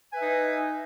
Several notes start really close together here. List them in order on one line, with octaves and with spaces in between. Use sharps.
G#5 B4 E5 D#4